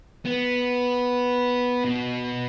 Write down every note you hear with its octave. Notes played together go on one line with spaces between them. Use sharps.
B3
B2